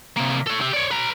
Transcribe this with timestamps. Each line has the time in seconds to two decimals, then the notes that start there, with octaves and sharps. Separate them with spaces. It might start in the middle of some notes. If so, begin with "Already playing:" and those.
0.17 C3 A#3
0.47 A4 C#5
0.61 G4 E5
0.73 C#5 D5
0.91 B4 A#5